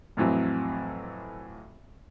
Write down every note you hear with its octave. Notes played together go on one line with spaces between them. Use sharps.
F2 A2 E3 F#3 C4